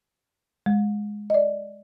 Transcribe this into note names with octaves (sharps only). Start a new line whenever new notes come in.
G#3
D5 D#5